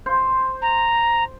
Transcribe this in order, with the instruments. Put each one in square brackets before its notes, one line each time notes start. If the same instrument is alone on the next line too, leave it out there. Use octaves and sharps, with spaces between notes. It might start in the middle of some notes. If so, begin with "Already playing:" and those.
[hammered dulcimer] C5
[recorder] A#5